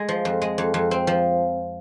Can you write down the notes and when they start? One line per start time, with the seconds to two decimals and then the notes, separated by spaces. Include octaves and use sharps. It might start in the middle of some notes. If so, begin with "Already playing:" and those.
Already playing: G#3
0.09 F3
0.25 F2
0.42 G#3
0.58 F2
0.74 F2
0.91 C4
1.07 F3